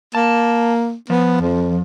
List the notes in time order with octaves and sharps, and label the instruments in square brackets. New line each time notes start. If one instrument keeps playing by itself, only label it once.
[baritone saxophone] A#3 [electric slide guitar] A5
[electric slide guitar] F3 [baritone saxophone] B3
[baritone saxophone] F2